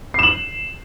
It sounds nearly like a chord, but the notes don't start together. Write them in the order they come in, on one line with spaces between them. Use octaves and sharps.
C7 E7 F#7